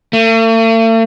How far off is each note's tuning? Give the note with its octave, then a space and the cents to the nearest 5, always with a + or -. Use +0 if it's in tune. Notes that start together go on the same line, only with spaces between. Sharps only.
A3 +45